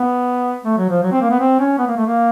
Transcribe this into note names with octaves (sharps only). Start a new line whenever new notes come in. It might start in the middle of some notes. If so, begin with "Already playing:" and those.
Already playing: B3
A3
F#3
F3
F#3
C4
A#3
B3
C4
C#4
B3
A#3
A3
A#3